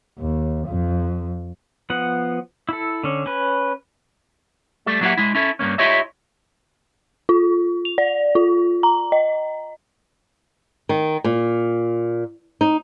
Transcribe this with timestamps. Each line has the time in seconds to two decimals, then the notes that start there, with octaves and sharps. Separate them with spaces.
0.19 D#2
0.68 F2
1.90 F3 B3 F#5
2.69 E4 A4
3.04 D3 C#4
3.26 C#4 B4
4.86 G3 A3 A4
5.01 F#3 A#3 D#4 E4 G4 F#5
5.18 G#3 E4
5.35 C#4 E4 A4
5.59 G2 B2 A#3 C#4
5.78 E4 F4 G4 C#5 D#5 E5
7.29 F4
7.85 F7
7.98 D5
8.35 F4
8.83 A#5
9.12 D#5
10.89 D#3
11.24 A#2
12.61 D#4